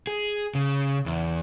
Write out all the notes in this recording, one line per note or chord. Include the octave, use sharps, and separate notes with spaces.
G#4
C#3
E2